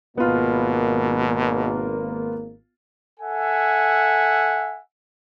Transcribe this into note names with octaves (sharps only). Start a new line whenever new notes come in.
G#1 B2 A#3 B3 F4
A4 E5 F#5 G#5